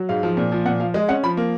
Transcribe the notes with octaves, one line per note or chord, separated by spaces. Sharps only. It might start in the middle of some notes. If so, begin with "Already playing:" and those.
Already playing: F#3
G#2 F5
F3
A#2
F3
A#2 F#5
F3 F5
G#3 D#5
C#4 F#5
F3 B5
A#3